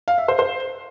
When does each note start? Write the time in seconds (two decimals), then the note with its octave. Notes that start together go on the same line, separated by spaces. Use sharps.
0.08 F5
0.18 E5
0.28 C5
0.39 C5